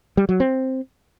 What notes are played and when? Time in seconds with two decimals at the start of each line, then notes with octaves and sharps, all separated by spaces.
0.17 G3
0.29 F#3
0.40 C4